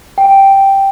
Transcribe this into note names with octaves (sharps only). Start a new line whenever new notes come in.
G5